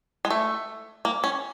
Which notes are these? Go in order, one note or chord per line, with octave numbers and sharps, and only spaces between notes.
G#3
A3
A#3
C#4